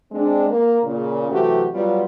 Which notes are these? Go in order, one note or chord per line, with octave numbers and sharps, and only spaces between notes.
G#3 C4 D4
A#3
A#2 C#3
C3 E3 F#3 A3 F#4 G4
F#3 G3 B3 F4